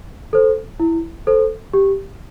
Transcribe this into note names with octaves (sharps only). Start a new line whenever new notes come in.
A4 C5
E4
A4 C5
G4